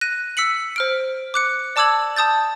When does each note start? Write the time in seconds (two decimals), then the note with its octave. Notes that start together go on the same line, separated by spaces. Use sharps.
0.01 F#6 A#6 D#7
0.37 E6 B6 C#7 F#7
0.76 C5 F6 D7
1.34 D6 F#6 C#7
1.76 D5 A5 D6 E6 G#6 F#7
2.16 A5 D#6 G6 A6